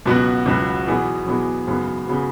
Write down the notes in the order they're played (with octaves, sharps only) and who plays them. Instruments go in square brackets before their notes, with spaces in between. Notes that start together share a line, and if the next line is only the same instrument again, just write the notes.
[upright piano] C#2 B2 F#3 B3 F#4
C#2 B2 F#3 B3 F#4
E2 B2 F#3 B3 G#4
E2 B2 F#3 B3 G#4
G#1 F#2 C#3 F#3 B3
C#3 F#3 B3